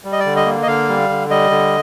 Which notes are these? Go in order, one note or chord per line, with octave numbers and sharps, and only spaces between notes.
G3
D#5
D5
D3
D#5
A#3
D#5
D3 F5
G3
D3
G3 D#5
D3